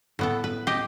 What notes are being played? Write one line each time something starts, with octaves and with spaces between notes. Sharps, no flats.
A2 B3 A4
B4
G4 D#5